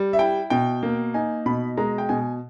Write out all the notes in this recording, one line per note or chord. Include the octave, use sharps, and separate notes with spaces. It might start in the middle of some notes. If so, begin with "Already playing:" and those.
Already playing: G3
E5
E4 G5
B2 G5
A#3
D#4 G#5
B2 B5
G#3 A#5
G5
B2 G#5